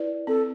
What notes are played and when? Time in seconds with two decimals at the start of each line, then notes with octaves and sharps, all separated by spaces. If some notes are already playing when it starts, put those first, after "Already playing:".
Already playing: E4 B4 D5
0.27 C4 A4